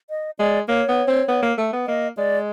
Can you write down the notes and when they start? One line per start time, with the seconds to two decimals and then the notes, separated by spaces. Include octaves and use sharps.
0.10 D#5
0.39 G#3 D5
0.68 A#3 C#5
0.88 B3
1.08 C4
1.28 B3
1.42 A#3
1.58 A3
1.73 B3
1.87 A#3 D#5
2.17 G#3 D5